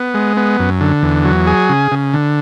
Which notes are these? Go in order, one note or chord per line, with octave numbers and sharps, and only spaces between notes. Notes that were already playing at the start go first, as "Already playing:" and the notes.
Already playing: B3
G#3
B3
F#2
D3
E2
F#3
G#4
C#3
C#3
D3